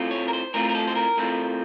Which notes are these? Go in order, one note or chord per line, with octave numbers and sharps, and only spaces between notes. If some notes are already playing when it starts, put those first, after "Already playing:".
Already playing: A2 A3 C4 F4
C#5
A#4
C5
A2 A3 C4 F4 A#4
A#4
A4
C5
A#4
A2 A3 C4 F4